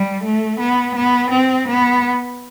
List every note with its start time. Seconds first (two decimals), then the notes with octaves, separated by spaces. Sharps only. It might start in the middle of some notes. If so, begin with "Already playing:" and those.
Already playing: G3
0.24 A3
0.59 B3
0.96 B3
1.31 C4
1.68 B3